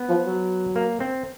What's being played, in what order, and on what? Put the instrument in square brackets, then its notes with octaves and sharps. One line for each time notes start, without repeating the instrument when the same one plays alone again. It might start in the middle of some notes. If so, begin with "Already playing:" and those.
Already playing: [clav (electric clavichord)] B3
[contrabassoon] F3
F#3
[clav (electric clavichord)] A#3
C4